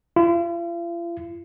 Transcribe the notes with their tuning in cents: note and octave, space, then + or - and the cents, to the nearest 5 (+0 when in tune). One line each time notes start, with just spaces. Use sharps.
F4 -40